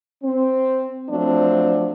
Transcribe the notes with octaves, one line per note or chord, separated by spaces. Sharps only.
C4
F3 F#3 A3 C4 D4